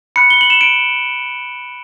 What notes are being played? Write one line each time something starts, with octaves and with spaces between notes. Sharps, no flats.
B5 F#6 C#7
G7
F#7
E7
D7